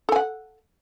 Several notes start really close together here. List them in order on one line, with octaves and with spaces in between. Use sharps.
A4 G#5 F#5